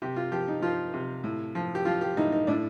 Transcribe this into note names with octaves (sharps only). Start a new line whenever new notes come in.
C3 G4
F4
F3 G4
D#4
F3 F4
C3
A2
F3
G4
F3 F4
G4
A2 D#4
D#4
A2 D4